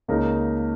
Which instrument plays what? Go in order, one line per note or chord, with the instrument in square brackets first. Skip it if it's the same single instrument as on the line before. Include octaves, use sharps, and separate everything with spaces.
[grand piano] C#2 C#3 A#3 D#4 A#4